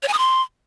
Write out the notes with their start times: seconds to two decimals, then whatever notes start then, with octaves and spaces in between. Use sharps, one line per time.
0.03 C#5
0.08 G#5
0.13 D#6
0.19 C6